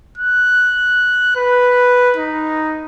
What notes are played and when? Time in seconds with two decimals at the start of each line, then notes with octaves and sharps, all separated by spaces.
0.18 F#6
1.36 B4
2.17 D#4